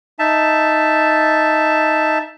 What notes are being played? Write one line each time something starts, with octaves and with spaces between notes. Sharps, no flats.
D#4 E5 A5